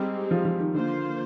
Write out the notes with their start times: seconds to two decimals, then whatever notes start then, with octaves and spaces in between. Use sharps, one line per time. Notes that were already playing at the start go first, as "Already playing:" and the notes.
Already playing: G3 G#3 C4 D#4 G4
0.31 F3
0.45 F3
0.60 D#3
0.74 D3 A#3 F4 C5